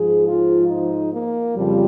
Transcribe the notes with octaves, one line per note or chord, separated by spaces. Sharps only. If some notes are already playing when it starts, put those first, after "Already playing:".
Already playing: G#2 F3 G#4
F4
D#4
A#3
F2 C#3 F3 G3